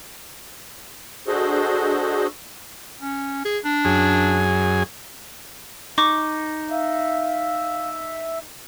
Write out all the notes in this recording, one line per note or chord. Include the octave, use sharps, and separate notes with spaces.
D4 F#4 G#4 A4 C5 D#5
C#4
G#4
D4
F#2 G#4
D#4 C#6 D6
E5 F5